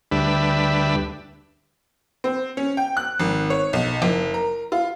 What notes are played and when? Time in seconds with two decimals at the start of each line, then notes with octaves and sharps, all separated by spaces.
0.12 D2 G3 D4 B4 E5
2.24 C4
2.57 C#4
2.77 G5
2.97 F#6
3.20 G#1
3.50 C#5
3.73 B1
4.02 F#1
4.34 A#4
4.72 F4